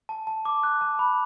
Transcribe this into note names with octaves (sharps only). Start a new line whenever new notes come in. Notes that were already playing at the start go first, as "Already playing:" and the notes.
A5
A5
D6
F#6
A5
B5